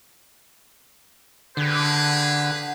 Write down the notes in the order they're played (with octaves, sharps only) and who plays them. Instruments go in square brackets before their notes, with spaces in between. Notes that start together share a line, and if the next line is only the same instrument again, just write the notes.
[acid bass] D3 [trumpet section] G4 G#4 B4